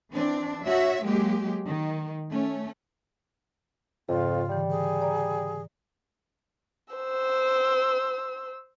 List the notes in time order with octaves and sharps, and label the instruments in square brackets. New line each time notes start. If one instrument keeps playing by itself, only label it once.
[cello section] E3 C4 D4
F#4 C#5 E5
F#3 G#3 A#3 G4
D#3
A3 C#4
[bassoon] F2 [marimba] G#2 C#3 [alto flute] F4
[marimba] D3 E3 [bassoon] G3
[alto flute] G#4
[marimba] D5 A#5
[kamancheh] C5 E6